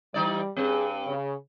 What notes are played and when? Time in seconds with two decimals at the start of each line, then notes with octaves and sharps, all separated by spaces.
0.14 E3 G3 D#4 D5
0.56 G2 C4 G#4
1.06 C#3